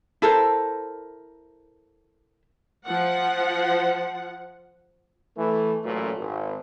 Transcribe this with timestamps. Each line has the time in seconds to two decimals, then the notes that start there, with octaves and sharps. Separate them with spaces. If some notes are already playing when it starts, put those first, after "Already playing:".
0.22 E4 A4 A#4 C5
2.86 F3 F#5
5.37 E3 A3
5.84 A1 F#2 A#2 E3 F#3 A3
6.17 G#1